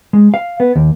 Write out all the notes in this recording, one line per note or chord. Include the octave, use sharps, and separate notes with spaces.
G#3
F5
B3
D#2